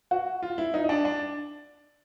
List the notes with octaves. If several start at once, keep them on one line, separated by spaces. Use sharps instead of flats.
F#4
F4
E4
D#4
D#4
D4
D4